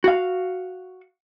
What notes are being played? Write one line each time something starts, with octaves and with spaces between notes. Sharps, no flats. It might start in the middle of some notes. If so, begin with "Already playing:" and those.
F#4 F5